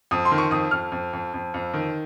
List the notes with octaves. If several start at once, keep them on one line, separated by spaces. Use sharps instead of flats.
F2 D#6
C6
D#3
C#6
F2 D#6
F2 F6
F2
F2
F2
F2
D#3